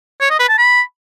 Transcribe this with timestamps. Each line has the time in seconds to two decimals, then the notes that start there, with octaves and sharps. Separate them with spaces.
0.21 C#5
0.30 D#5
0.39 B4
0.49 A5
0.58 B5